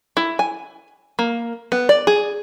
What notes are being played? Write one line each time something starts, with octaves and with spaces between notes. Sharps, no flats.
E4
G#5
A#3
B3
D5
G#4